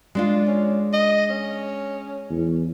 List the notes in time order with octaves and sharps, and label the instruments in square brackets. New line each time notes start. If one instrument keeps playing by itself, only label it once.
[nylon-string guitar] G#3 D4 F4
[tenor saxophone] C#4
D#5
C#4
[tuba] E2